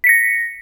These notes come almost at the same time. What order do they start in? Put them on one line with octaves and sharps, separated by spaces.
B6 C#7 A#6